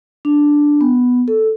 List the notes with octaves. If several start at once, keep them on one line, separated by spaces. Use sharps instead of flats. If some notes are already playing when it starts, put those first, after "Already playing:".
D4
B3
A4